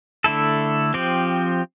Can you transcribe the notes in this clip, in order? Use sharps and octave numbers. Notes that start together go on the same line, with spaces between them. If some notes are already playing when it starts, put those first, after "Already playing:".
D3 A3 E4 A4
F3 C4 G4